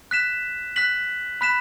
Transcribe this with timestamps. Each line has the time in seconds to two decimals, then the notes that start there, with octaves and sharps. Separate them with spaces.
0.11 F#6 B6 E7
0.76 F#6 B6 F#7
1.41 B5 F#6 B6 E7